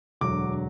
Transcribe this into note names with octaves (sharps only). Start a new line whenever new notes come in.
E1 D2 D3 F#3 D6